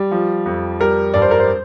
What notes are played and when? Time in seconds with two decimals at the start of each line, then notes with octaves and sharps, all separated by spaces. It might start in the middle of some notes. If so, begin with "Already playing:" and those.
Already playing: G3
0.11 F3
0.46 F2
0.80 G3 A#4
1.14 G2 D5
1.22 C5
1.31 A#4
1.40 C5